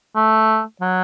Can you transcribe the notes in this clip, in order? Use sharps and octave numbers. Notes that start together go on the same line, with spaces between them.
A3
F#3